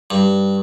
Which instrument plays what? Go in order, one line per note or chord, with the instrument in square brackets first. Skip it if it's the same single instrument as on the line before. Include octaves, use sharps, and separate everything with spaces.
[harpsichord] G2